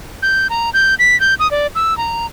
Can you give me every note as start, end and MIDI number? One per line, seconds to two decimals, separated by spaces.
0.22 0.47 91
0.50 0.70 82
0.74 0.95 91
0.99 1.18 95
1.20 1.34 91
1.39 1.50 87
1.51 1.67 74
1.75 1.96 88
1.98 2.26 82